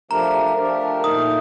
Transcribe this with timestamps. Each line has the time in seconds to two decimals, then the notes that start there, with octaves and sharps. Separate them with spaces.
0.11 F3 A3 D4 G4 A#4 A#5
0.57 F3 A3 D4 G4 A#4
1.04 A#2 A3 D#4 A#4 D#6